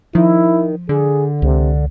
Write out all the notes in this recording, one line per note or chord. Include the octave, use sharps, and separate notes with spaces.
D#3 F3 E4
D3 G#4
C#2 C3